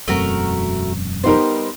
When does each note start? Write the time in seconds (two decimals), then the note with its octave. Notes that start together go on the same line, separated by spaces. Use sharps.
0.08 E1 F#2 A3 C4 F#4 A#4
1.24 G3 B3 D#4 A#4 C5